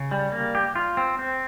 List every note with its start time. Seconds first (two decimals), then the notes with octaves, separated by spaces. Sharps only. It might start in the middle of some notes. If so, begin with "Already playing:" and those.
Already playing: C#3
0.11 G3
0.32 A#3
0.55 G4
0.76 F4
0.97 C4
1.19 C4